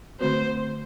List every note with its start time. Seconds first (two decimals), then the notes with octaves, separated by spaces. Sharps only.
0.20 D3 A3 C4 F#4 C5